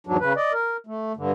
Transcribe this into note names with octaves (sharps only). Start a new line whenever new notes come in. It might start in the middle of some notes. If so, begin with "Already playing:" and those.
E2 G#2 F#3 D4
C#3 B4
D5 D#5
A#4
A3
G2 D3